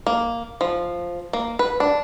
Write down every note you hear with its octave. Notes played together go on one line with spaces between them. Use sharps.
A#3
F3
A#3
B4
D4